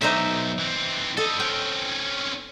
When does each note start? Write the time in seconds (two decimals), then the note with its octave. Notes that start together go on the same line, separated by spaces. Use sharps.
0.01 B1 D#4 C5 E5
0.60 E3 C4
1.17 G3 A4 D#5
1.40 C4 C#4 G5